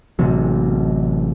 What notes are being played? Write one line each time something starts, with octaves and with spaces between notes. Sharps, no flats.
A1 C3 F#3